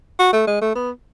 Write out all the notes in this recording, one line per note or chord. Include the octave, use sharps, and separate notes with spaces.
F#4
A3
G#3
A3
B3